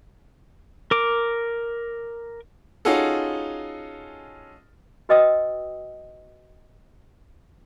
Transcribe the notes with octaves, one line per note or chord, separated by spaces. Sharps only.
A#4 D6
C#4 D#4 F4 F#4 G#4 A4
F#4 B4 D#5 G5 D#6 E6